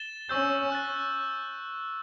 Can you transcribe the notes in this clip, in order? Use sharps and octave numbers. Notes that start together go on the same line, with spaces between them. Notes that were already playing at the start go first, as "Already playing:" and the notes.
Already playing: A6 E7 G7
C#4 C#6 E6 G6
C#6 F#6 A6